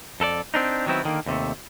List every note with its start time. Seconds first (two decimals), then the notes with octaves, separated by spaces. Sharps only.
0.20 F2 A4 A#4 D5
0.54 C4 D4 D#4
0.86 D#3 F#3 B3 C4 E4
1.03 D3 D#3 A#3
1.26 D#2 C3 A3